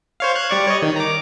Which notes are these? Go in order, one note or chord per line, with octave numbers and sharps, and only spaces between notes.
C5 C#5 F5
F#6 G#6
G3 D5 C#6
C#5 D#5
D#3
A#5 D6